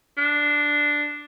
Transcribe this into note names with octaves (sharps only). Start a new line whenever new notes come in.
D4